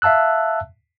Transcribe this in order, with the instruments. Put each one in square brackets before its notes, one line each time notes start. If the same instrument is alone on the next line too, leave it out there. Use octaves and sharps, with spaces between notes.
[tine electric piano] E5 F5 A5 E6 F#6